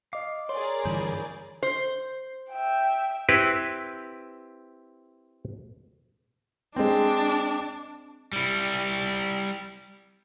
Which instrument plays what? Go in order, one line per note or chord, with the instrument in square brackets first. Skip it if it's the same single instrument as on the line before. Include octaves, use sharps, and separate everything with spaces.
[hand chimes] D#5 D6 [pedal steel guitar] F5
[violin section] G#4 A#4 D5 [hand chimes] C#5 [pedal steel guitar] C6
[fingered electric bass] G2 D3 E3 [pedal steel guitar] C5 B5
[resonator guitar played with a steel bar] C5
[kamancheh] E5 G5
[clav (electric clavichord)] C4 E4 G4 B4
[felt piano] G#3 C4 [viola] D4
[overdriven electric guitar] G3 E4